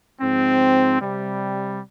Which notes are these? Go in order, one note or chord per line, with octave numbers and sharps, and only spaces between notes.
G#2 F3 C4
C3 G3